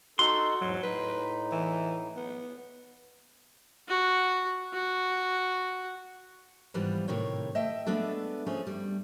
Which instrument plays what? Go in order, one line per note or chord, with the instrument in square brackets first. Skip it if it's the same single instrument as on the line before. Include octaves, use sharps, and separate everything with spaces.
[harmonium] D#4 A4 [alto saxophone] F#4 [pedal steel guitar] C6
[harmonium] E2 G#2 [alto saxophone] F#3
[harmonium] A2 D#4 [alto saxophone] B4
[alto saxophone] E3
B3
[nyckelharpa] F#4
F#4
[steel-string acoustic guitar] G#2 E3 F3 G3 B3 F4
A2 C3 D#3 C#5 G5
A3 D#5 E5 G5
G#3 A3 B3 D4 A4
F3 A3 C#4 G#4
G2 G3